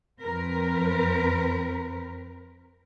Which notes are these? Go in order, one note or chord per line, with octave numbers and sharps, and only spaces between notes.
F2 C4 A#4 B4